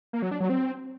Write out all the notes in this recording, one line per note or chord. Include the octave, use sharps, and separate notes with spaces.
A#3
F#3
D4
F#3
C4